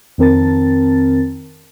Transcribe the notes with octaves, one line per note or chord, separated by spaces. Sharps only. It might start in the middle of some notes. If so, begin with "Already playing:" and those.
F2 D#3 C4 A#4 A5 A6